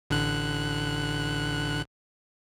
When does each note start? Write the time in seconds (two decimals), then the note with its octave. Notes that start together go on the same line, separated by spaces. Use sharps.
0.10 A1 D3 F#6